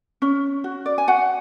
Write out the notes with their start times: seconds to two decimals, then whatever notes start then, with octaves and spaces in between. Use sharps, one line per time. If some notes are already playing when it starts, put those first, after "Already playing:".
0.22 C#4
0.64 F#4
0.86 D5
0.98 G#5
1.08 F#4 F#5